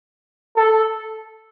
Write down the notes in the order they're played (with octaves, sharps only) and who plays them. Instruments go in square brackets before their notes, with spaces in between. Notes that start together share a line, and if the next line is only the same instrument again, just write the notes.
[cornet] A4